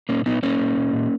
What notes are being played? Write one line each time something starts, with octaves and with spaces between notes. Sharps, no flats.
A#2 A#3 C#4
A#2 B3 D#4
A#2 A#3 C#4
A#2
A#2
A#2